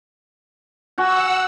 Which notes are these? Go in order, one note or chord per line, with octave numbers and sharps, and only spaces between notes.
F#4 F#5 G#5 E6